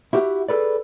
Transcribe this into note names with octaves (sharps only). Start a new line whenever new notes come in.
E4 F#4 G4 B4 E5 F#5
G#4 A4 B4 D5